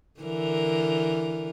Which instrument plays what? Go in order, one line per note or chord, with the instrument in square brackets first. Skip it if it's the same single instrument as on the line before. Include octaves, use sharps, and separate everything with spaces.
[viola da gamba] D3 E3 A#4